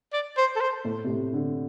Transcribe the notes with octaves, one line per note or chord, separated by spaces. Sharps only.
D5
C5
A4
C5
A2
C3
A2
D3